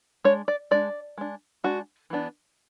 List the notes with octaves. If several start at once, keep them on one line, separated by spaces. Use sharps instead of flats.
G#3 D4 C#5
D5
G#3 D4 D5
G#3 D4
G#3 D4 F#4
E3 B3 D4